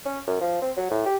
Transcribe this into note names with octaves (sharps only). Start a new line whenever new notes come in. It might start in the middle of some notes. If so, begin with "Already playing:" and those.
C#4
F#2
F3
C4
F#3
A2
G4